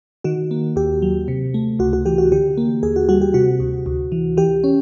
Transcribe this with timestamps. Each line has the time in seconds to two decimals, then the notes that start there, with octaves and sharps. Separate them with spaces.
0.24 D#3 F#4
0.51 A#3
0.76 D#2 G4
1.02 F#3
1.28 C3
1.54 A3
1.79 C#2 F#4
1.93 F#4
2.06 E3 G4
2.18 F#4
2.32 D3 G4
2.57 A#3
2.83 D#2 G#4
2.96 F#4
3.09 G3 F#4
3.22 G4
3.34 C3 F#4
3.60 D2
3.86 D2
4.12 E3
4.37 E3 G4
4.64 C#4